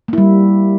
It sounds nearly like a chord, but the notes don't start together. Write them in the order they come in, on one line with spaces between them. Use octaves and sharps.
A#3 E4 G3